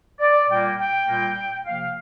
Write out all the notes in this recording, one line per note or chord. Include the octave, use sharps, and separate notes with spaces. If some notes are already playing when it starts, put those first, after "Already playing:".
D5
A#2 G3 A#3 G5
G5
A#2 G3 A#3
C3 F3 A#3 F5